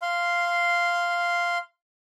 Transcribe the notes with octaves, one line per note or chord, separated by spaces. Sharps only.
F5 C6